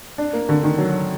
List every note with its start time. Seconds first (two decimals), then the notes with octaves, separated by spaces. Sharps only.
0.18 D4
0.33 A#3
0.49 D3
0.63 D#3
0.78 F#3